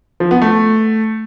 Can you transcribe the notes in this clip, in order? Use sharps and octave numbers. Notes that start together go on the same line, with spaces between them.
F3
B3
A3